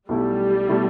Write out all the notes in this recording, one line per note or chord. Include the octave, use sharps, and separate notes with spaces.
B1 B2 G3 A3 E4
B2 A3 E4